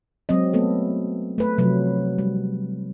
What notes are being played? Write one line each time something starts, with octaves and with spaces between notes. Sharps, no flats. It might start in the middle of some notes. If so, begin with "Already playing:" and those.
F#3 G#3 C4 D#5
A3 B3 A4
A3 B4
C3 F3 F#3 B4
G3